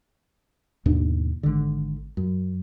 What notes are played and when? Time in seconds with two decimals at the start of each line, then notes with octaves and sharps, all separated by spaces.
0.86 D#2 G#2 B2 D4
1.43 G#1 D3
2.17 F#2